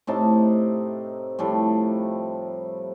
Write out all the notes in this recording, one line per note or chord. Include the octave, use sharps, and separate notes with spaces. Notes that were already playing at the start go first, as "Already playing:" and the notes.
A2 C3 D#4 A5
A2 F3 G3 A3